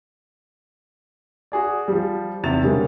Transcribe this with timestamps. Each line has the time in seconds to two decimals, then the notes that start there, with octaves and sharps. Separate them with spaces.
1.52 F#4 G#4 D5
1.88 F3 G3
2.43 B1 E2 C3 A6 F7
2.63 B2 D3 G3 G#3 A#3 C#4